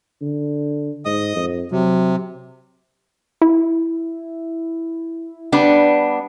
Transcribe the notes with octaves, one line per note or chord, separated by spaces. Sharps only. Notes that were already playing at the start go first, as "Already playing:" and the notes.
D3
G#2 D#5 D#6
F2
C3 F#3
E4
G3 B3 D4